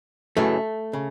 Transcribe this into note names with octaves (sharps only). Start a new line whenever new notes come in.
F#2 C#3 E3 A3
C#3